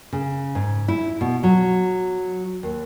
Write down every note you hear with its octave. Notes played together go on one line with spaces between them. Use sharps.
C#3
G#2
E4
B2
F#3
D#2